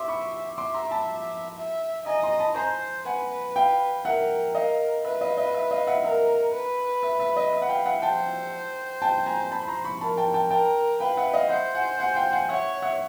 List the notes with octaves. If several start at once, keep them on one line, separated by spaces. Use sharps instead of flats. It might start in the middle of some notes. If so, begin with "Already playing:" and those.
Already playing: E5 C6 D6
B5 C#6
E5 C6 D6
A#5 C6
A5 B5
E5
D#5 G#5 A#5
A#5 C6
A5 B5
C5 G#5 A#5
B4 F#5 G#5
F5 G5
A#4 E5 F#5
A#4 D#5 F5
B4 E5
D#5 F5
D#5 F5
E5
D#5 F5
E5 F#5
A#4 E5
B4
E5
E5
D#5
E5
F#5
F5 G5
E5 F#5
C5 G5 A5
G5 A5
G#5 A#5
A5 B5
B5
A#5 C6
B5 C#6
A#4 A5 B5
G5 A5
G5 A5
A#4 G5 A5
B4 F5 G5
E5 F#5
D#5 F5
C5 E5 F#5
F#5 G#5
F#5 G#5
F5 G5
F#5 G#5
C#5 E5 F#5
E5 F#5